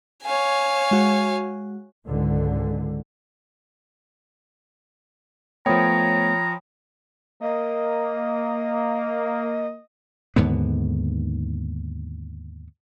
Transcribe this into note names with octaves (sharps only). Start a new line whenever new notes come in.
C#5 F5 G#5
G#3 F#4
C#2 G#2 D3
F3 A3 B3 C#5 G5 A#5 B5 D#6
A#3 D#5
D#2 G#2 D3 B3